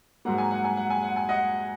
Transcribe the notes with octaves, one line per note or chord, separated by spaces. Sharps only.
G#2 F#3 A#3 F#5
G#5
F#5
G#5
F#5
G#5
F#5
G#5
D#5 F#5